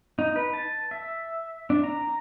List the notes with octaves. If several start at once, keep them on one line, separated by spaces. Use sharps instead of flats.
D#4
B4
A5
E5
D4
A#5